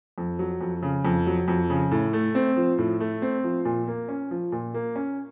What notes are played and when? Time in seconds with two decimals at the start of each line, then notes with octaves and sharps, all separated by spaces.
0.18 F2
0.39 F#3
0.61 F2
0.83 C#3
1.05 F2
1.27 F#3
1.48 F2
1.70 C#3
1.91 A2
2.13 A3
2.35 C4
2.57 F3
2.78 A2
3.00 A3
3.22 C4
3.44 F3
3.65 A#2
3.88 A#3
4.09 C#4
4.31 F3
4.52 A#2
4.74 A#3
4.96 C#4